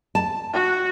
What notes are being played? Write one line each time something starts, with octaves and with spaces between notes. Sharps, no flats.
A5
F#4